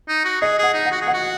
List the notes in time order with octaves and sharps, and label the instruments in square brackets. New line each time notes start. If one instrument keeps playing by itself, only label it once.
[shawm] D#4
F#4
[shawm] G#4 [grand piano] D#5
[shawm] G#4 [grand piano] F#5
[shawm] D#4
[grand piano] F#5
[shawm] F#4
G#4
[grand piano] F#5
[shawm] F#4